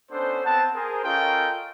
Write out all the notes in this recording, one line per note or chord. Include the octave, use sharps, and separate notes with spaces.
B3 C#4 D4 A4 C5
B3 C4 F#5 A5
G#4 A#4 C5
C#4 F4 A4 A#4 D#5 G5